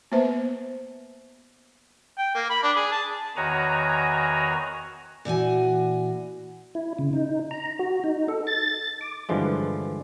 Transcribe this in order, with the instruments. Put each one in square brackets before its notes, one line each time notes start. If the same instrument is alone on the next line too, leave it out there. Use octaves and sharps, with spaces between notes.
[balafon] A#3 B3 B4 C5 E5
[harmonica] G5
A#3
B5
D4
G#4
A5
[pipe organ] E2 D#3 F#4 C#5 G#5 A#5
[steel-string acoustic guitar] A#2 E3 F#4 G#5
[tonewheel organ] E4
C#3
D#4
A#5
F#4
D#4
A4
A6
D6
[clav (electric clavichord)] G2 D3 E3 F3 G#3